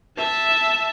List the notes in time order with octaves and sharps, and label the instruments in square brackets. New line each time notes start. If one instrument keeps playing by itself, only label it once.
[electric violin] E5 A5